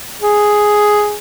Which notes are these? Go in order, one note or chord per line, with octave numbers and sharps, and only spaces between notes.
G#4